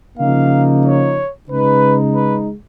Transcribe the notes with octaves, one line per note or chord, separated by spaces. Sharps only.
C#3 F3 A#3 D#4 F5
C#5
C#3 G#3 D#4 B4
B4